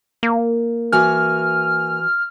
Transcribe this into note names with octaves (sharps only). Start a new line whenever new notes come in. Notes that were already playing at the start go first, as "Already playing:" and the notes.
A#3
E3 F#4 G#5 F6